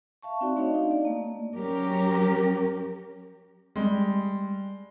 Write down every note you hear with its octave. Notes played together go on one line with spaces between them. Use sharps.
E5 F5 A5 C#6
C4 D#4 F#4 D5 E5
A3 D4 D#4 C#5 D#5 F5
D#4 F5
D5
A3 A#3
F#3 C#4 G4 A#4
G3 G#3